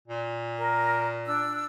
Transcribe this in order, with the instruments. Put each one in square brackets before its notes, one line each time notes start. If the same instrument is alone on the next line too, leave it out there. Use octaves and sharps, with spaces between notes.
[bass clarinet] A#2
[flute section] A#4
D4 E6